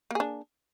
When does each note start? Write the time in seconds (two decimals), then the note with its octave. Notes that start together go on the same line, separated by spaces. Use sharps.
0.11 A#3
0.15 G#4
0.20 D4